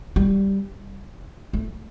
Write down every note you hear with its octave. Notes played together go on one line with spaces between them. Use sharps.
G3
A3